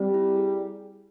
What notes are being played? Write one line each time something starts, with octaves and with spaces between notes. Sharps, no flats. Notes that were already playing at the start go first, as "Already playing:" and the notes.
Already playing: G3 C4
E4
G#4